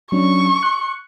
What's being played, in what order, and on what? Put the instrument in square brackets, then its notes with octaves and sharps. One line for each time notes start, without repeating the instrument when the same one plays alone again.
[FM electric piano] F#3 C#4 D4 [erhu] C#6
[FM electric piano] F#6 C#7